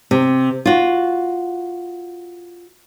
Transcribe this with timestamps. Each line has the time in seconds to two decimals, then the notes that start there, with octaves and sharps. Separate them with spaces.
0.11 C3
0.65 F4 F#4